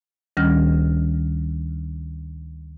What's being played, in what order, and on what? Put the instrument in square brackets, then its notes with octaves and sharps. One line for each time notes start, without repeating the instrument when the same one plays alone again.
[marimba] D2 D#3 G3 C#4 F6